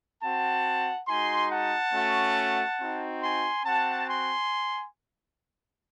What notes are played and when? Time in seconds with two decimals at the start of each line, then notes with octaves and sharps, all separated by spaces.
0.22 C4 F#4 F#5 A5
1.08 G#3 D#4 F#4 G#5 C6
1.51 F#5 A5
1.93 A3 C#4 F#4
2.79 C4 D#4 F#4
3.22 G#5 C6
3.65 C4 F#4 F#5 A5
4.08 G#5 C6